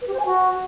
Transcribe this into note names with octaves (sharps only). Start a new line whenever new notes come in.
B4
G4
C5
G#5
F#4